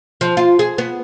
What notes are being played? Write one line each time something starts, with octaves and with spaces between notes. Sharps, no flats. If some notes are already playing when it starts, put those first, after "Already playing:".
F3
F4
G#4
B3